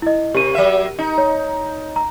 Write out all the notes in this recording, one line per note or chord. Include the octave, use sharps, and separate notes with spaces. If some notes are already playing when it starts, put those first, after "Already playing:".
E4 D#5
C3 G4 A#4 D#7
F#3 E5
D#4
C#5
A#5